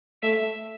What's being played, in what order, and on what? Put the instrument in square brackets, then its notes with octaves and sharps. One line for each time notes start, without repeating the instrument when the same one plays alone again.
[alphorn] A3 [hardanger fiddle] E5